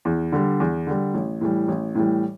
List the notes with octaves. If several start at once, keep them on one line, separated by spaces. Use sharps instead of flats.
E2
D3 G3
E2
D3 G3
A1
A2 E3 G3
A1
A2 E3 G3